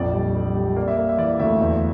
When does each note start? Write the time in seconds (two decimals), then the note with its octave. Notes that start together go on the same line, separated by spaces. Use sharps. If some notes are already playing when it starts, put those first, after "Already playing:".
Already playing: A#1 F2 D5
0.13 G3
0.35 G3
0.55 G3
0.76 A#3 D5
0.88 E5
0.97 A#3 D5
1.09 E5
1.18 E3 D5
1.39 D2 E5
1.61 E2